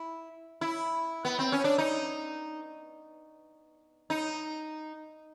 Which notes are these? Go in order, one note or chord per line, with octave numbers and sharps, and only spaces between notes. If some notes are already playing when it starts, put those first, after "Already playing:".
Already playing: E4
E4
B3
C4
C#4
D4
D#4
D#4